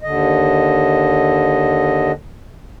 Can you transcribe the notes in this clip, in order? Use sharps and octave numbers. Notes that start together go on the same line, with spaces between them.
D#2 D3 D#5